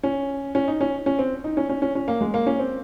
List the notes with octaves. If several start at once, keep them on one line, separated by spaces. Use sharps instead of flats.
C#4
C#4
D#4
C#4
C#4
C4
D#4
C#4
C#4
C#4
C#4
A#3
G#3
A#3
C#4
C4